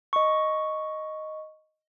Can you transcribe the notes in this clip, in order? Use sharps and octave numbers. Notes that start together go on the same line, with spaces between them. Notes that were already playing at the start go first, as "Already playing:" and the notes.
D#5 C#6